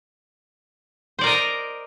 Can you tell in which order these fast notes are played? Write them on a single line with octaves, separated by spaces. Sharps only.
C5 D5 A#4 D#5 A#5